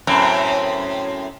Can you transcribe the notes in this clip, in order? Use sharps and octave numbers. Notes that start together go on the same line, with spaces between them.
F#2 A2 C4